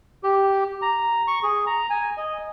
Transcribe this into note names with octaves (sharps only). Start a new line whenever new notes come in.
G4
A#5
C#6
G#4
A#5
G#5
D#5